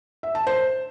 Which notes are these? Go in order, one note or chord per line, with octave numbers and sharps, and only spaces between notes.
E5
A5
C5